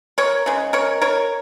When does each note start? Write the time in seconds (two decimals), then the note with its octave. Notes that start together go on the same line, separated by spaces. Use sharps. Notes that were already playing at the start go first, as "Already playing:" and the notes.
0.18 A#4 C#5
0.46 C#3 G#3
0.73 A#4 C#5
1.02 A#4 C#5